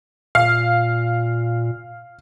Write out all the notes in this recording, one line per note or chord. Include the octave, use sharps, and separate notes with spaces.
A#2 F5